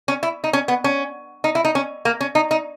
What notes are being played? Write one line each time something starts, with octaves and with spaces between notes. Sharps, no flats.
C#4
E4
D#4
C#4
B3
C#4
D#4
E4
D#4
C#4
A#3
C#4
D#4
D#4